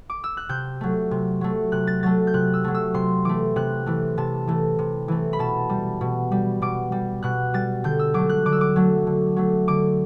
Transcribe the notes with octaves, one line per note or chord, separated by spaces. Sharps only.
D6
E6
F#6
C3 G6
F#3 A3
C3
F#3 A3
C3 F#6
A6
F#3 A3 A6
G6
C3 F#6
E6
F#3 A3
E6
C3 C6
E3 A3 D6
C3 F#6
E3 A3
C3 A5
E3 A3
C3
E3 A3
B5
B2 A5
G3
B2
G3
B2 D6
G3
B2 F#6
G3 A6
D3 G6
E6
F#3 A3 D6
F#6
D3 D6
E6
D6
F#3 A3
D3
F#3 A3
D3 D6